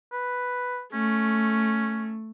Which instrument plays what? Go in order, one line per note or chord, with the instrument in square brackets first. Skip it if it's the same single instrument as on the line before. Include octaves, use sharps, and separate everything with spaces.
[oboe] B4
[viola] A3 [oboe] C#4